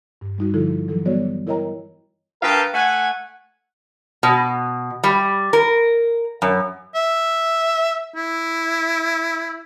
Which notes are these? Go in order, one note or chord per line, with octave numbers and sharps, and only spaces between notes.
G2
G3 D#4 F#4
D3 F3 E4 F4 A4
E3 F#3 A4
G3 B3 F#4 C#5 D5
E4 A#4 C#5 D#5 G5 A#5
G2 A#4 B4 F5 G5 A5
A3 F#5 G#5
B2
G3
A#4
F#2
E5
E4